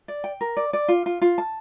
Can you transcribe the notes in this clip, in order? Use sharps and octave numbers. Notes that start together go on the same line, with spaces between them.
D5
G5
A#4
D5
D5
F4
F4
F4
A5